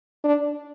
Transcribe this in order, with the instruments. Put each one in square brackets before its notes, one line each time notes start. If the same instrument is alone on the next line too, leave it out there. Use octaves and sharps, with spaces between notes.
[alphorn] D4